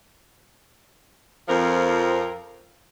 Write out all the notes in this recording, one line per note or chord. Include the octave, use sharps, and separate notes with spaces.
F2 F3 C4 A#4